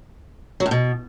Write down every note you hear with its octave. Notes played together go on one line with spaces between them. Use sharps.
F#3
A2
B2